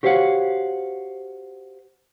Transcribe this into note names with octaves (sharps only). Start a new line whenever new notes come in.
F#4 G4 C5 C#5 F5 F#5